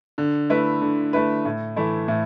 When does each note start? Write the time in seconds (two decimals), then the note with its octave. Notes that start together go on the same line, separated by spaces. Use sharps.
0.18 D3
0.50 A3 E4 B4
0.82 D3
1.13 A3 E4 B4
1.45 A2
1.76 E3 A3 E4
2.08 A2